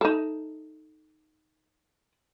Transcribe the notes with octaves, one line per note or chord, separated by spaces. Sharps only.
D#4 A4